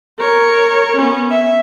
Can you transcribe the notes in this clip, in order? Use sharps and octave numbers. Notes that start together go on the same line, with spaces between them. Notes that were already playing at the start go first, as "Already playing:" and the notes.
A#4 C#5
B3 C#4
E5